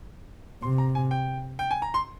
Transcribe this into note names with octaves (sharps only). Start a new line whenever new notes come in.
C3 C6
A#5
G#5
G5
G5
G#5
A#5
C6